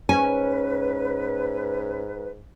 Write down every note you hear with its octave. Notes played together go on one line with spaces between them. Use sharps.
G#2 C#4 B4 G#5